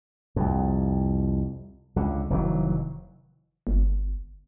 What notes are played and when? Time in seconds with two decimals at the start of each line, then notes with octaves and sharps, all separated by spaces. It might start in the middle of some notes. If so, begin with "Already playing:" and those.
0.36 C2 F2
1.96 C#2 D3
2.30 F1 D#3 E3 F#3
3.67 G1